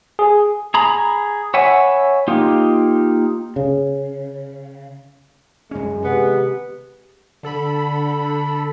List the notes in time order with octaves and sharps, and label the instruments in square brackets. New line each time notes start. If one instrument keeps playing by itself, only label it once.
[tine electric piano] G#4
[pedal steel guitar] G#4 A#5 B5
C#5 E5 F#5 G#5 B5
A#3 D#4 F4 G4
[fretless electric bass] C#3
[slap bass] F#2 C#4 [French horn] G#3
[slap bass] C3 D#3 [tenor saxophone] B3 [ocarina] G4
[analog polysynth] D3 A4 B5